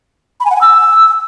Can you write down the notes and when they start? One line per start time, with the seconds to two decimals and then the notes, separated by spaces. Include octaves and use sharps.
0.40 B5
0.45 G#5
0.51 F#5
0.56 G#5
0.61 E6